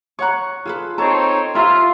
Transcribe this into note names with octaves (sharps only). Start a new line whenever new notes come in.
C#5 F#5 A#5 C#6 F#6
F4 G#4 A4 B4
C4 D#4 A4 C#5 A5 A#5
E4 F4 G4 E5 A#5 C6